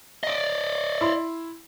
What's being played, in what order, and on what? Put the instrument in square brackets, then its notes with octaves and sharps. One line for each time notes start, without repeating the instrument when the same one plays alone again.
[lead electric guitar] D5 D#5
[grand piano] E4 C6